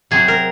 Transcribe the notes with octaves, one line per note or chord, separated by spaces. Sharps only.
C3 F#3 C4 G#4
A#4